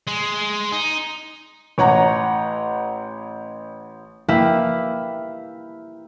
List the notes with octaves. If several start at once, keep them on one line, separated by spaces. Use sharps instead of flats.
G#3
D#4
A1 C#5 F#5 A#5
A#3 E4 G4 B4 E5 F5